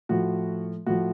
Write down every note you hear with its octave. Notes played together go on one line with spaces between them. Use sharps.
A2 F3 F#4
A2 F3 F#4